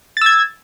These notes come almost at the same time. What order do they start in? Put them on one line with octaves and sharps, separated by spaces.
A6 E6 G#6